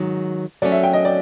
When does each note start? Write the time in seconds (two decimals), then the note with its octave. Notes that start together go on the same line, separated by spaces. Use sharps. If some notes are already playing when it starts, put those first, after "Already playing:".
Already playing: G#2 D#3 F#3
0.62 F#3 A3 C#4 D5
0.72 E5
0.83 G5
0.93 D#5
1.05 D5